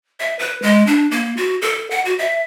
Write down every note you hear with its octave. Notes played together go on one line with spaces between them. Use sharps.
E5
B4
G#3
D4
A#3
F#4
A4
F#5
F#4
E5